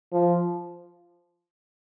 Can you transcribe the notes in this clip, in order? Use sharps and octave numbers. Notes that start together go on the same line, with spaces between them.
F3